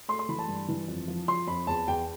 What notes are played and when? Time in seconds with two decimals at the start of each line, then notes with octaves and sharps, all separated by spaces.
0.08 A3 C6
0.19 C6
0.29 E3 B5
0.39 A5
0.48 G2
0.68 E3
0.88 F2
1.08 F3
1.28 F3 C6
1.47 F2 B5
1.67 E2 A5
1.88 E2 G5